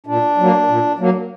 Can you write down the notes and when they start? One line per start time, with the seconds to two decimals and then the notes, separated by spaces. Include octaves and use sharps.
0.06 A#2 D4
0.38 F#3 A#3
0.68 A#2
0.99 F#3 A#3